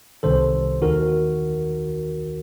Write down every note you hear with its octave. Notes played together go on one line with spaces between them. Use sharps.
C2 C3 D#3 A4 C5
D#2 D#3 F#4 A#4